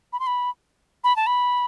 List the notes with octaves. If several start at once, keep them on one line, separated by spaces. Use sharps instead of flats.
B5
C6
B5
B5
A5
B5